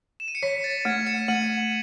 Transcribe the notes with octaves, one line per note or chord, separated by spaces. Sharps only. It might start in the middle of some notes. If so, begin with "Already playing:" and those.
E7
D#7
C#7
C#5 B6
A6
A3 G#6
C#7 E7
A3 D#7 F#7